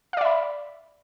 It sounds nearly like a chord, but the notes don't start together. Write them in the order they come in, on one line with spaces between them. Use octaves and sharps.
F5 D5 E5 B5